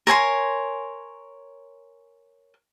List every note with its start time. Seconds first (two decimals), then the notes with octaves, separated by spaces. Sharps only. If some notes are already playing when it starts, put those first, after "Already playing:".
0.07 A#4 C#5 G#5 C6